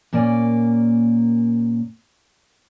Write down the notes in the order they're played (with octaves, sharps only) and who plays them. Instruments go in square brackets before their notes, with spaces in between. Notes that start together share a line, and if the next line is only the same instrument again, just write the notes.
[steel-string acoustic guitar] A#2 A#3 C#4 D5 G#5